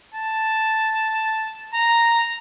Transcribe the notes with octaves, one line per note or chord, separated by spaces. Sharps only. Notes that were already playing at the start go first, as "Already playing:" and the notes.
A5
A#5